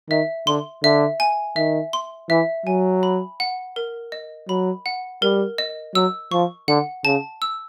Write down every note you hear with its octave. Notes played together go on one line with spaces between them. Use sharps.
D#3 E5
D3 C6
D3 E5
G#5
D#3 E5
C6
E3 E5
F#3 G#5
B5
F#5
A#4
D#5
F#3 B5
F#5
G3 A#4
D#5
F#3 E6
F3 C#6
D3 F#5
C#3 A5
E6